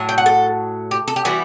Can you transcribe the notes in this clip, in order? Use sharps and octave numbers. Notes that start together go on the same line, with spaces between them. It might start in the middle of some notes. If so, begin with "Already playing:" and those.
Already playing: A2 F#3
G5
F#5
A4
G4
A4
G4
E3 G3 B3 E4 F#4